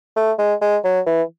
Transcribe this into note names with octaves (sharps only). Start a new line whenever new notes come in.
A3
G#3
G#3
F#3
E3